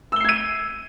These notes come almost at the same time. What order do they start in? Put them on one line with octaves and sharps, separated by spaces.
E6 G7 C7 G#6 D#7